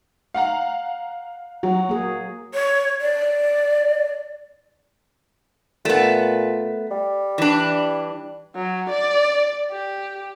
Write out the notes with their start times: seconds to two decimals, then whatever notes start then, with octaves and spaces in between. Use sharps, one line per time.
0.34 F5 F#5 A#5
1.63 F#3 F#4
1.89 A#3 G#4
2.54 C#5
3.01 D5
5.85 A#2 A3 B3
6.91 G3
7.38 E3 D4
8.55 F#3
8.90 D5
9.71 G4